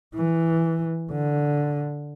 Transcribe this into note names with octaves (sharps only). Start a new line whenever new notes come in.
E3
D3